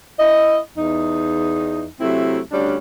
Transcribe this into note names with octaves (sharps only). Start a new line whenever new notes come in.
E4 D#5
E2 D#4
C3 F#3 A3 C4 E4
D2 G3 C#4 D4